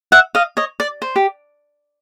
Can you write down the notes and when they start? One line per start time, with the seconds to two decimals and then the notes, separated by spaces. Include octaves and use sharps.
0.12 E5 F#5
0.35 D#5 F5
0.57 C#5 D#5
0.80 D5
1.02 C5
1.16 G4